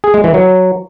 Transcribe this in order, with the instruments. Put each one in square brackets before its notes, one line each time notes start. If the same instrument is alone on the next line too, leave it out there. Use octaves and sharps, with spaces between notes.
[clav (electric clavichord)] G#4
G#3
E3
F#3